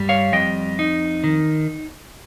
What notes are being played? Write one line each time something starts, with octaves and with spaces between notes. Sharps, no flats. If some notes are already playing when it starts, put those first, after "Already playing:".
Already playing: G2 G3
C#5 F5
F2 D#5 G5
D#4
D#3